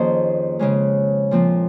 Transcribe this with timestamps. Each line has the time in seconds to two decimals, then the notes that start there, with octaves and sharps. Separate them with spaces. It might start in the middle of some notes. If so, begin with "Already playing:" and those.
Already playing: F2 D#3 A#3 C#4 G#4 C5 D#5
0.59 C#3 G#3 C#4
1.31 A#2 F3 C4